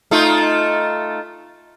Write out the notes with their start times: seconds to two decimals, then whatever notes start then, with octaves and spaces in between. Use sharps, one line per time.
0.11 A3 D#4 F4